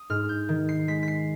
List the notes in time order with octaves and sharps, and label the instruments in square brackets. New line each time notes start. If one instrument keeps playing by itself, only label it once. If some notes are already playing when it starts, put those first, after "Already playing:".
Already playing: [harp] D#6
G#2 F6
G6
D#3
C7
G#3 B6
B6
C7